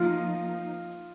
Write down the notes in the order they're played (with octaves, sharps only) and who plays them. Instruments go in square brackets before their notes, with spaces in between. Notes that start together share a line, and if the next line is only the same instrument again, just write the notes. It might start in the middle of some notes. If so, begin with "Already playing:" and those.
Already playing: [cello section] F3 A#3 D#4 [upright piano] F4